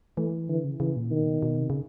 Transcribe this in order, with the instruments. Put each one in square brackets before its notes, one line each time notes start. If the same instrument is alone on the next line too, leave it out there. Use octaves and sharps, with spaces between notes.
[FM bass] E3 [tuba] A3
[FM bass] D3 [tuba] E3
[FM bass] C#3
[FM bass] C#3 [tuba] E3
[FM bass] A#2
[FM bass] B2 [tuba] D#3
[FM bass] A#2
B2
B2
C3
C#3